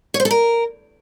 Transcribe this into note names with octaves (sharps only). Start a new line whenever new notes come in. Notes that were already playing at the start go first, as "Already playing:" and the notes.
C#5
C5
A4
A#4